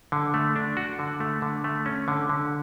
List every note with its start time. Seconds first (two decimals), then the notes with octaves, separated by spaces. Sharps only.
0.12 D3
0.34 A3
0.56 D4
0.77 F#4
0.99 D3
1.20 A3
1.42 D3
1.64 A3
1.86 C#4
2.08 D3
2.29 D3